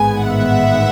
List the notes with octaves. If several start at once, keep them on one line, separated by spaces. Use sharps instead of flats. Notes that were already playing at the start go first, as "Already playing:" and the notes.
Already playing: A1 G#2 D#3 G#3 B3 G#5
E5 F#5